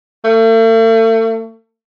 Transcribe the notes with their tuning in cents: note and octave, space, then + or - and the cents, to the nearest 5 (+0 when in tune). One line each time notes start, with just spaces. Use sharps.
A3 +40